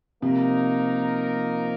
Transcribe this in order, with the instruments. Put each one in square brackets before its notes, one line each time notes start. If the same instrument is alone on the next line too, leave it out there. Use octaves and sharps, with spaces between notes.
[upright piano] C3 [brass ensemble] F3 A#3 D#4 A#4